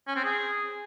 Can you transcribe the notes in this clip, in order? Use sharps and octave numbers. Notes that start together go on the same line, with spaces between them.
C#4
C4
G#4